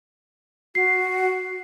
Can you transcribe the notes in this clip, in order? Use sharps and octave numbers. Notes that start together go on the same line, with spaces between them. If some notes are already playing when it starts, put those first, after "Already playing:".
F#4 C7